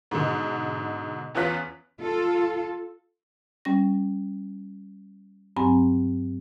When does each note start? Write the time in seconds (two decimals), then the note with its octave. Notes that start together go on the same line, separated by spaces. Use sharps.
0.11 G#2 B2 D3
1.35 E2 B3 C#4 F4 F#6 B6
2.01 F4 A4
3.65 G3 C#4 A#6
5.56 G2 F#3 C4 G#5 A#5